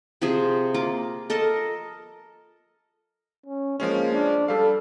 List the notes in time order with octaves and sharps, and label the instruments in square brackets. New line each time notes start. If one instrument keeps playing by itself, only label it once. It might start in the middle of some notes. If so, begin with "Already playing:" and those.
[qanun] C3 F3 G#4
A#3 F4 D6
A4 A#4 D#5 A5
[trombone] C#4
[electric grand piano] F3 G#3 C#4 [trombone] A#3
[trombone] D4
[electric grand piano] G3 F5 [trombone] A4